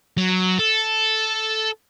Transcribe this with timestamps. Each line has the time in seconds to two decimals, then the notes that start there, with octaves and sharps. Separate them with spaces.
0.17 F#3
0.59 A4